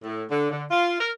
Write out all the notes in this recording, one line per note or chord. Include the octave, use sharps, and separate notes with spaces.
A2
D3
D3
F4
A#4